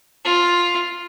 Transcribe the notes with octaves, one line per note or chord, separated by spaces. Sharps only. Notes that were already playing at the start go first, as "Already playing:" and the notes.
F4